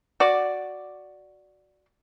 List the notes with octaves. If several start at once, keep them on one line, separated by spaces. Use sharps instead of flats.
F#4 D5